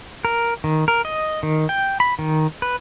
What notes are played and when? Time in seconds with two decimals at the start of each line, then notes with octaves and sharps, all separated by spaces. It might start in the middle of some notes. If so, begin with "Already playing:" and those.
0.25 A#4
0.64 D#3
0.88 A#4
1.05 D#5
1.43 D#3
1.69 G5
2.00 B5
2.19 D#3
2.62 B4